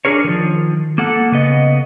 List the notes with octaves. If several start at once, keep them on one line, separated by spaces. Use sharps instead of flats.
D4 G#4 A#4 C#5
D#3 F3
A#3 A4 F#5
C#3 B3 D#5